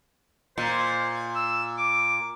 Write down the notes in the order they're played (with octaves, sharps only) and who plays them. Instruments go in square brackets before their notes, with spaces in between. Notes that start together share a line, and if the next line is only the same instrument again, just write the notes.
[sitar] A#2 [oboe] C5
[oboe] E6
D6